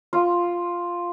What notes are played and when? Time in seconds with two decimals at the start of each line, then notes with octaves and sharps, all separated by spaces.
0.13 F4